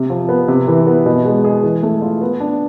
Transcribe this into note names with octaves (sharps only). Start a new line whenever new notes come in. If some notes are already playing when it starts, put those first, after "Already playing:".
Already playing: C3
F3
B3
C3
E3
B3
B2
G#3
G#4
E3
A3
F4
B3
D4